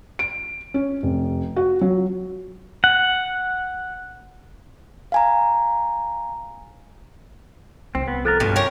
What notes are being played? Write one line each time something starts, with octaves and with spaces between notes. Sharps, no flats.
D7
C#4
F1
F#4
F#3
F#5
F5 G#5 A#5
C2 C4
B3
F3 A4 A#4 F#6 A6
G2 B2 G3 C#4 F4 G4
A#4 C#5 G5